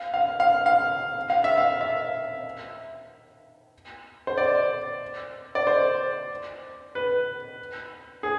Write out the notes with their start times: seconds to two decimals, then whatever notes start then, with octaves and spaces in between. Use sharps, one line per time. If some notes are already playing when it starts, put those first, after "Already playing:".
Already playing: F5
0.14 F5
0.40 F5
0.66 F5
1.30 F5
1.44 E5
1.57 F5
1.81 E5
4.27 C5
4.38 D5
5.55 D5
5.67 C5
6.95 B4
8.23 G#4